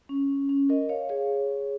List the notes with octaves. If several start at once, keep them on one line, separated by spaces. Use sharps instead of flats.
C#4
C#4
A#4 D#5
C#5 F5
G#4 C#5